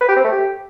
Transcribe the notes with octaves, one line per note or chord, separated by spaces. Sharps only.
B4
G4
C4
A3
G4